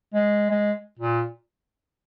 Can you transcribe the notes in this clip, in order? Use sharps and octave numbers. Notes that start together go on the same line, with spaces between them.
G#3
G#3
A#2